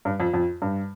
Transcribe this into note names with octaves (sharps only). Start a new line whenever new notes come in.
G2
F2
F2
G2